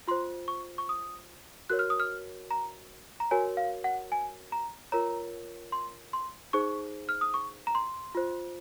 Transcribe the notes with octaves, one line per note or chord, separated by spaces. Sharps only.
F4 C5 C6
C#6
C#6
D#6
F#4 A#4 C#5 F#6
F6
D#6
F6
A#5
A#5
F#4 A#4 C#5 G#5
F5
F#5
G#5
A#5
F4 A#4 C#5 A#5
C6
C6
D#4 G#4 C5 C#6
F6
D#6
C#6
A#5
C6
F4 C5